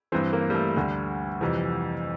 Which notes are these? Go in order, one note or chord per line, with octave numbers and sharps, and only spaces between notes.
G2 E3 C4
A#3
G3
A3
D2 D3 G3
F2 C3 E3